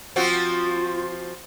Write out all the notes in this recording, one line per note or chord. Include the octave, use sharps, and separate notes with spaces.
F3 C4 F4 F#4